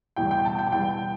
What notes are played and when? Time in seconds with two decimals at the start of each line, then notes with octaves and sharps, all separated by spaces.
0.16 E2 B2 G3 G5
0.31 G5
0.45 A5
0.58 G5
0.72 E2 B2 G3 G5